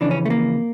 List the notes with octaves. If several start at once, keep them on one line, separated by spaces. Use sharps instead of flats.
F2 C#3 E3 D4
C#4
A3
A#3